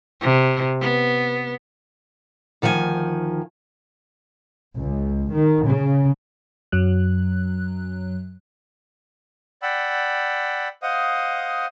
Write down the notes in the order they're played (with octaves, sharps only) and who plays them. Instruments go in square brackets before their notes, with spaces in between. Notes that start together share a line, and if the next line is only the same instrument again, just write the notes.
[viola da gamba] C3
B3
[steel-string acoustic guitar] D2 D#3 F3 A4 G#5
[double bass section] C#2
D#3
C#3
[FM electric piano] F#2 F#3 F#6
[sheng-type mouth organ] D5 F#5 G5 B5 E6
C5 D#5 F5 F#5 D#6